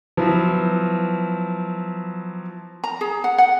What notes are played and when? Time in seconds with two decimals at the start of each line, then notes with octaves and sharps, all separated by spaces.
0.17 F3 F#3 B3 E4
2.84 A#5
3.01 G#4
3.24 F#5
3.38 F#5